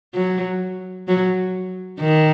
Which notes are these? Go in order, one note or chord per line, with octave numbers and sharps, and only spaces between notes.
F#3
F#3
D#3